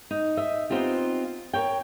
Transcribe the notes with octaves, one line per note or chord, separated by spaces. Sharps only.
D#4
D#5 E5
B3 C4 D#4 F4 G4
A#4 C#5 G5